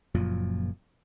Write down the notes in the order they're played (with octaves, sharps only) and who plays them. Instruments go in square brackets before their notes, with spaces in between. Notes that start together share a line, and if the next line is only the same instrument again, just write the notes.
[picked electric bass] F#1 F#2 A#2 F3